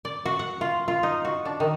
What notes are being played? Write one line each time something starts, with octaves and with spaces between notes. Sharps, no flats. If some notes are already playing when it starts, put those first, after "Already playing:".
D5
F#4
F#5
F4
F4
D#4
F#4
D4
D#3